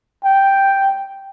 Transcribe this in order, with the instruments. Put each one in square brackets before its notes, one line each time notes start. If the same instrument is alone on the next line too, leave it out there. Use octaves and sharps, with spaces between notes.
[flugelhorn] G5